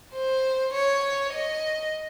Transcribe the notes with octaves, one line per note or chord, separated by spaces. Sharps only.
C5
C#5
D#5